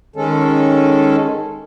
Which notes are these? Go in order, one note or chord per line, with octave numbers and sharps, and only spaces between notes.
D#3 G#3 C#4 A4